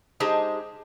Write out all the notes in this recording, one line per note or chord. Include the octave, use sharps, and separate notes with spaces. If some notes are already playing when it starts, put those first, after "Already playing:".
G#3 D#4 G4 G#4 C5 A5